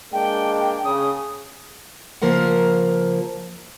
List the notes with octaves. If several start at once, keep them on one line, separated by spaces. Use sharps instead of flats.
G#3 A#3 D4 G5
C#3 D#6
C#3 F3 A#3 A#4 C5 F#5